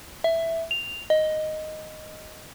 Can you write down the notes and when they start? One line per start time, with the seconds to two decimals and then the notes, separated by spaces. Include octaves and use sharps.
0.24 E5
0.71 F7
1.10 D#5